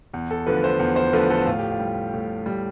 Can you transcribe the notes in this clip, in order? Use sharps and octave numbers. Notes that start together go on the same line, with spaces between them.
E2
A4
D3 F3 A3 B4
C5
E2
C5
D3 F3 A3 B4
A4
A2 F4
G4
F4
G3
A2
G3